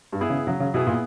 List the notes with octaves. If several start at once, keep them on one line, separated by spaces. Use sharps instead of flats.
G2
B3 E4 G#4
C#3
C#3 F#3
C#3
B2 B3 E4 G#4
A#2